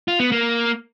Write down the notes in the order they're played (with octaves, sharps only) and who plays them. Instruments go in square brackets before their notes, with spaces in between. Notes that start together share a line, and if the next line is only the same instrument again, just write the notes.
[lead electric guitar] F4
B3
A#3